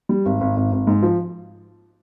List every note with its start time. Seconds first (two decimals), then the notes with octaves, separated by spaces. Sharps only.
0.09 G3
0.26 G#1
0.41 G#1
0.56 G#1
0.72 G#1
0.87 G#2
1.02 F3